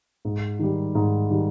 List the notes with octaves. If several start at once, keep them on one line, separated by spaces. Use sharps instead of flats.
G#2
D#3 G3
G#2
D#3 G3